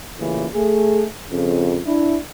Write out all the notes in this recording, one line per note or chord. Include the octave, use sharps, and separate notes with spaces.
A1 A#2 C#3 E3
A3 G#4
F2 C#3
D4 E4